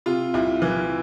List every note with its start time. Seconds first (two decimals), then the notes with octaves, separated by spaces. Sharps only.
0.06 C3 F4
0.34 C2 E4
0.62 E3